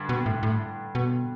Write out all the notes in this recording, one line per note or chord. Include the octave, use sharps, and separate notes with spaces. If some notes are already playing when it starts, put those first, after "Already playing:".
Already playing: G2 D3
B2
A2
A2
B2